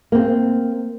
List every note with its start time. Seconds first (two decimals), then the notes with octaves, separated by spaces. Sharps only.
0.12 A#3 C4